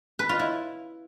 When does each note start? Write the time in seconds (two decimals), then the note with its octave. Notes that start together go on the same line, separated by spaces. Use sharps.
0.19 B4
0.29 F4
0.39 E4